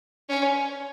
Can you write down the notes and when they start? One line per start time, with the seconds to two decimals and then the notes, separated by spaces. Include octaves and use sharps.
0.29 C#4